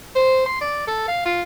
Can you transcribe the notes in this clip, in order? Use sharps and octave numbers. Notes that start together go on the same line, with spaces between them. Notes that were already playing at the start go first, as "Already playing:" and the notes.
C5
C6
D5
A4
F5
F4